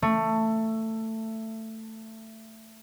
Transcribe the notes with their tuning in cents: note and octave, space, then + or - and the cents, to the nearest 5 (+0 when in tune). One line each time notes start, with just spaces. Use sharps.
A3 +15